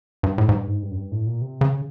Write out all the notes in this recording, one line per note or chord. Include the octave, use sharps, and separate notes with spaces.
G2
A2
G#2
G2
G#2
G2
F#2
G2
A2
A#2
C3
C#3